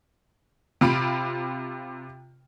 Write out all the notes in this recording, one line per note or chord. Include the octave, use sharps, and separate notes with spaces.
C3 F4 B5 D7